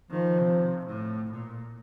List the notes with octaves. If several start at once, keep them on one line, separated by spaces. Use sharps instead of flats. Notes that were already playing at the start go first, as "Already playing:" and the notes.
D#3 F3
C3
A2
A#2